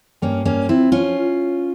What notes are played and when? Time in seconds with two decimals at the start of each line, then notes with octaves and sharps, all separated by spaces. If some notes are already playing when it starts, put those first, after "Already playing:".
0.22 G2 A#3 C#4
0.45 A#3 C#4
0.68 F3 C4 E4
0.92 C#4 F4